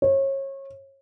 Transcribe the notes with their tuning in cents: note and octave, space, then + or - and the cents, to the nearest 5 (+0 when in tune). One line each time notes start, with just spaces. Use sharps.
C#5 -30